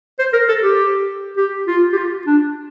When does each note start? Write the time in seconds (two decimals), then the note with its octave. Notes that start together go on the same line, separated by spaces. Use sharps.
0.19 C5
0.33 A#4
0.49 A4
0.63 G4
1.37 G4
1.68 F4
1.93 G4
1.97 F4
2.27 D4